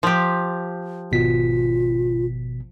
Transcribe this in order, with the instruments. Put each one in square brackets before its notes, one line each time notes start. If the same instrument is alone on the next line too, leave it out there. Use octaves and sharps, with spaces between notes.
[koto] F3 G4
[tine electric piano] G#1 B2 B6 [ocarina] F4